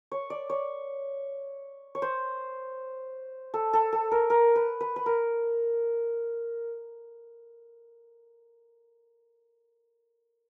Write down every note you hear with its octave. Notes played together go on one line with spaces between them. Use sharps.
C#5
D5
C#5
C#5
C5
A4
A4
A4
A#4
A#4
B4
B4
B4
A#4